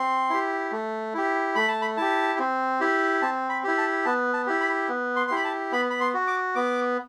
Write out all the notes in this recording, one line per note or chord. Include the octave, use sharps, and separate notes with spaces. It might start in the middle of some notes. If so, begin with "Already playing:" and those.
Already playing: C4 C6
E4 G4
A3
E4 G4
A3 B5
A5
B5
E4 G4 A5
C4
E4 G4
C4 A5
B5
E4 G4
A5
B3 A5
A5
E4 G4
B5
B3
C6
C6
E4 G4 B5
A5
B3 B5
B5
C6
F#4
D6
B3 D6